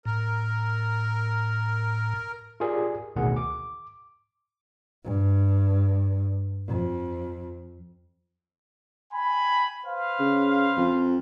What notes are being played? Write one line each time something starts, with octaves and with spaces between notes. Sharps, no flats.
A2 A#4
F4 G4 G#4 A#4 D5
A1 D2 B2 D#3 G#4 F#5
D6
G2
F2
G5 G#5 B5
B4 C5 F5
C#3
F2